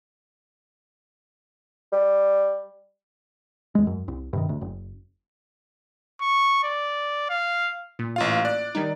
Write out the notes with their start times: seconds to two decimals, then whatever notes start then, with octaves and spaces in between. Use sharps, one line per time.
1.92 G3
3.75 E2 G#3
3.87 F#2
4.08 C2
4.33 G2 C3 D#3
4.49 D2
4.61 F#1
6.21 C#6
6.63 D5
7.29 F5
7.99 A#2
8.16 A1 F4 F5
8.45 D5 F#6
8.75 D#3 G3 D#4